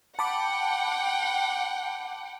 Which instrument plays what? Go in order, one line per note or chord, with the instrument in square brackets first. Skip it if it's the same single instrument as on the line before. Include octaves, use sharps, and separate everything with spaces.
[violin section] F#5 G5 [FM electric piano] A5 B5 D6